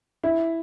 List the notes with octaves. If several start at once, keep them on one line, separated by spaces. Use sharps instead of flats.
E4